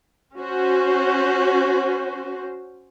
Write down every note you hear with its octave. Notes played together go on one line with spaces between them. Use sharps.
C#4 F#4 C5